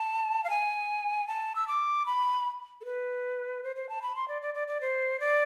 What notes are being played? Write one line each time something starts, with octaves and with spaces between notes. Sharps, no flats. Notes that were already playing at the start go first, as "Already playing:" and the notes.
Already playing: A5
F5
G#5
A5
E6
D6
B5
A4
B4
C5
C5
A5
B5
C6
D5
D5
D5
D5
C5
D5